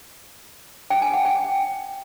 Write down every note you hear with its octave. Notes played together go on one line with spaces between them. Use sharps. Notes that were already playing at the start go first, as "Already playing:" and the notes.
G5
G#5
F#5
G5